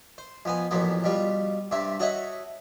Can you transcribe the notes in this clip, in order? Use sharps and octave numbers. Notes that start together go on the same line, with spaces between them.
C5
F2 B3 G#5
A1 F2 A#2 F#3 B3
B2 G3 F4
G2 C3 E5 A5
F#4 A4 C#5 D#5 E5 F#5